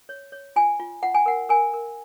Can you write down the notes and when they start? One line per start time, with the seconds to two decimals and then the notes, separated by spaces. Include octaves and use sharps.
0.09 C#5
0.32 C#5
0.56 F4 G#5
0.79 F4
1.03 F4 F#5
1.15 G#5
1.26 A#4 F#5
1.49 A#4 G#5
1.73 A#4